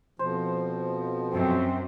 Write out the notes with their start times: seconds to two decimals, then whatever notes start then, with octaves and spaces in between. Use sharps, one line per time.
0.19 F2 B2 F3 C5
1.33 F#2 C4